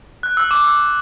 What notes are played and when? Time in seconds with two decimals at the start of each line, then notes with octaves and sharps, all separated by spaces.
0.23 F#6
0.37 E6
0.51 D6
0.64 E6